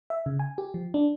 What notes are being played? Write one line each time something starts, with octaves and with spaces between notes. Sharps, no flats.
E5
C#3
G#5
G4
F3
D4